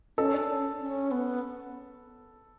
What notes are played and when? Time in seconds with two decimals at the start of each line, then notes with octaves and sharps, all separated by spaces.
0.18 C#4 A4
0.34 D4
0.49 C#4
0.81 C#4
1.11 B3